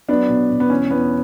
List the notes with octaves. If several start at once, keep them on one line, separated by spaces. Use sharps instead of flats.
F#3 B3 D4
B2
B2
B3
E2 C#4
E2 B3